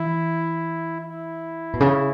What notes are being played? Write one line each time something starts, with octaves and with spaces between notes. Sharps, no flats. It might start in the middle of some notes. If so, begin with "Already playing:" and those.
Already playing: E3 E4
E4
B2
C#3